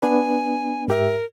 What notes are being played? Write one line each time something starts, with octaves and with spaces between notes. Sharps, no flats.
B3 D4 B4 G#5
G#2 G4 A#4 E5